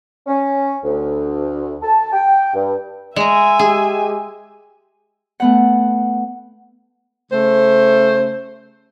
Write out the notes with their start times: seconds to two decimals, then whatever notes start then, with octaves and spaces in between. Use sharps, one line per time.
0.27 C#4
0.84 D2
1.83 A5
2.13 G5
2.54 G2
3.16 G#3 E5 G#5 A#5
3.59 G#3 G4 G#4
5.40 A3 B3 F#5
7.31 C#3 A3 C5